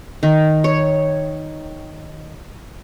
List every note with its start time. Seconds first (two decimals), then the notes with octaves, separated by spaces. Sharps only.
0.23 D#3
0.64 C#5